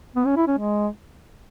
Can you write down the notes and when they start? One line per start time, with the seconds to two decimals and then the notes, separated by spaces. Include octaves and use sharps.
0.15 B3
0.26 C#4
0.36 E4
0.47 C#4
0.58 G#3